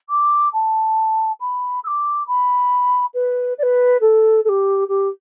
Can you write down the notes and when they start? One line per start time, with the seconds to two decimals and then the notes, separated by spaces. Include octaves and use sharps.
0.09 D6
0.53 A5
1.40 B5
1.84 E6
1.87 D6
2.27 B5
3.14 B4
3.58 D5
3.63 B4
4.01 A4
4.45 A4
4.49 G4
4.88 G4